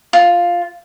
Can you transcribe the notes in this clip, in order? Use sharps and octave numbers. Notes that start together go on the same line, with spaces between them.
F4